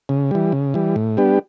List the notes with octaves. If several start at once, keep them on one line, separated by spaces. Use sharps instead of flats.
C#3
E3 G3
C#3
E3 G3
A2
G3 B3 D4 G4